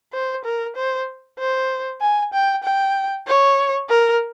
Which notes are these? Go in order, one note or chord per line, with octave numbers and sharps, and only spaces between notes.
C5
A#4
C5
C5
G#5
G5
G5
C#5
A#4